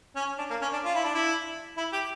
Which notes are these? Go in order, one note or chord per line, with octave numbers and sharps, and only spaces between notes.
C#4
D4
A#3
C#4
D4
F4
E4
D4
E4
E4
G4